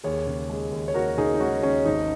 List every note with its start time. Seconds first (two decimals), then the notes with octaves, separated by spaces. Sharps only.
0.04 D#2 G#4 C#5
0.27 C#3
0.49 G#3
0.72 D#2
0.88 C#5
0.94 D#2 F#4 A#4
1.17 C#3 D#4 G#4
1.35 D#4
1.40 G#3 C#4 F#4
1.62 D#2 C#4
1.85 G#1 D#4